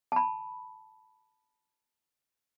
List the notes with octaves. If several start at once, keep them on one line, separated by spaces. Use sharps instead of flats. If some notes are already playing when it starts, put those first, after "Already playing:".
A5 B5